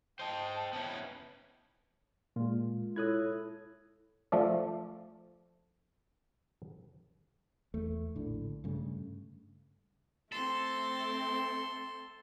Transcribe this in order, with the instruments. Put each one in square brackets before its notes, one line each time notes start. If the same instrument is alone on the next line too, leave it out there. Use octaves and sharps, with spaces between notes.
[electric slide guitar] C5 D#5 [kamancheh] G5 A5
[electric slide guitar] B3 C#4 E4
[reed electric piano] A#2 [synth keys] G#3 F4
[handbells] E4 A4 C#5 [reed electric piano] D#6 F#6 G#6
[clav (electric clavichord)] F3 A3 A4 D5
[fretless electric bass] E2 A3
A#1 A2 D3
G2 C#3 A3
[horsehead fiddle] A3 C4 [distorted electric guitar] A4 [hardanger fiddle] C6